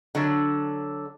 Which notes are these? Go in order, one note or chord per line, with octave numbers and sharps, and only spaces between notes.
D3 F#3 D4